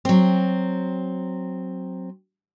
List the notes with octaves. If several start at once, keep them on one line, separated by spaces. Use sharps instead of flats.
F#3 C4